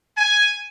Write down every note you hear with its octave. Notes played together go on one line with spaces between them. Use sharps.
G#5